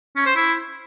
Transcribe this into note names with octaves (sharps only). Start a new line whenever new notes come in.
C#4
C5
E4